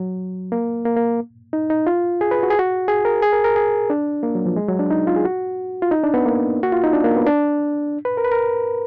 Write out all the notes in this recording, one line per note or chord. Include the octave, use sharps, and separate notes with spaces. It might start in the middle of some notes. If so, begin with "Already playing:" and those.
Already playing: F#3
A#3
A#3
A#3
D#4
D#4
F4
G#4
B4
F#4
G#4
F#4
G#4
A#4
G#4
A#4
A#4
G#4
D4
A#3
F#3
F3
G#3
F#3
D4
D#4
F4
G#4
F#4
F4
D#4
D4
B3
A#3
F#4
F4
D#4
D4
A#3
B3
D4
B4
A#4
B4
A#4